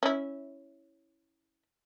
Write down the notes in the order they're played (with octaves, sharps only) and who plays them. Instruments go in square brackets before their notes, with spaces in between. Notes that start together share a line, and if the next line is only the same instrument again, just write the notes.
[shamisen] C#4 E4